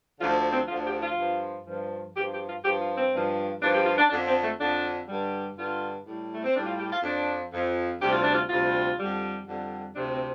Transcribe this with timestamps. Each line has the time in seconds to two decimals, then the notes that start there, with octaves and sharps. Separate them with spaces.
0.19 D2 D3 F3 F4
0.52 C4
0.68 D2 D3 F3 F4
0.85 G4
1.01 F4
1.17 G2 F3
1.66 G2 F3
2.15 G2 F3 G4
2.32 G4
2.48 F4
2.63 G2 F3 G4
2.81 F4
2.96 C4
3.13 G2 F3
3.61 G2 F3 D4
3.74 G4
3.86 F4
3.97 D4
4.10 F2 D3 F3 D4
4.26 C4
4.42 A3
4.59 F2 D3 F3 D4
5.08 G2 D3 G3
5.56 G2 D3 G3 F4
6.05 A2 G3
6.33 A3
6.43 C4
6.54 A2 G3 D4
6.66 F4
6.78 G4
6.91 F4
7.03 F2 F3 D4
7.52 F2 F3
8.00 D2 C3 G3 G4
8.10 F4
8.22 D4
8.33 F4
8.49 D2 C3 G3 F4
8.98 F2 D3 G3
9.46 F2 D3 G3
9.95 D2 C3 F3 D4
10.12 C4